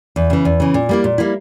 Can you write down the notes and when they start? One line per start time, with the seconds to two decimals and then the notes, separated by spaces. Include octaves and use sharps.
0.16 E2
0.30 C#3 E3
0.45 E2
0.60 C#3 E3
0.74 A#2
0.89 G3 A#3 E4
1.04 A#2
1.18 G3 A#3 E4